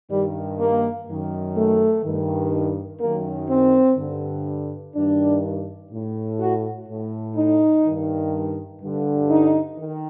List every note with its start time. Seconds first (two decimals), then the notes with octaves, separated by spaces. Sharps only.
0.11 G2 D#3 G3
0.60 A#3
1.08 F#2 D#3
1.57 A3
2.05 G2 D#3
3.01 F#2 D#3 A#3
3.50 C4
3.98 G2 D3
4.95 G2 D#3 D4
5.92 A2
6.40 F#4
6.88 A2
7.36 D#4
7.85 G2 D#3
8.82 G2 D3
9.30 D#4
9.79 D#3